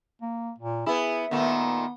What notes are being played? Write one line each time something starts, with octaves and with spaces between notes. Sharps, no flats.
A#3
A#2
B3 E4 G#4
A#2 D#3 A3 B3